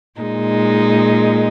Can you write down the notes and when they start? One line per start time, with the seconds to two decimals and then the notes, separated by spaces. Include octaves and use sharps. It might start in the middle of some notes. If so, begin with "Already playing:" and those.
0.20 A#2 G#3 D#4